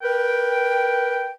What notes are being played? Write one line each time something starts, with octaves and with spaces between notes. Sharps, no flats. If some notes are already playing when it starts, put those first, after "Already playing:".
A#4 B4 G5